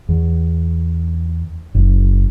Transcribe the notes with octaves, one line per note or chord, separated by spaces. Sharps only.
E2
F#1